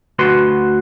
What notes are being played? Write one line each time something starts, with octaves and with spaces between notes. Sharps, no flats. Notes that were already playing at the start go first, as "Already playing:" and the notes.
D2 F#4 B4 C6